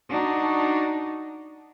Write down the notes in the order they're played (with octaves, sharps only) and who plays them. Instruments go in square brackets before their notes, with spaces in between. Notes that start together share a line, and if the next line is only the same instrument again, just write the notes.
[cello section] D4 D#4 F#4